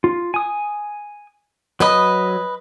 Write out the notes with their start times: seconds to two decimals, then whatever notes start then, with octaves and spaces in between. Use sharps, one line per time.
0.04 F4
0.34 G#5 D#6
1.80 F#3 B4 D#5 B5 D#6